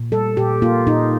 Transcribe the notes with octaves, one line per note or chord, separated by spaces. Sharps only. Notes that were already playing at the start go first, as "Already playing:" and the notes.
Already playing: A#2
G3 A4
A#2 G4
A#3 F4
A#2 D#4